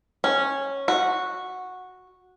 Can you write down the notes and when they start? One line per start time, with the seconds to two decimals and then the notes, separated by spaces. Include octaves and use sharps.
0.24 C#4
0.88 F#4